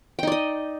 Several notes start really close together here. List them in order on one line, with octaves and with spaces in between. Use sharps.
G5 D#4 D5 D#5